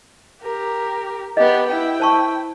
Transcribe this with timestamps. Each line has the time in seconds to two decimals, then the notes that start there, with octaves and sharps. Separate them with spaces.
0.43 G4 A#4
1.37 B3 G4 D#5
1.68 E4 G5
2.00 C5 A5 C#6